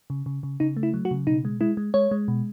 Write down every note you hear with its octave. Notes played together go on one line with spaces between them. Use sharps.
C#3
C#3
C#3
C#3 D#4
A3
E4
F#3
F#4
C#3
B2 D#4
G#3
G#3 E4
G#3
G#3 C#5
G#3
B2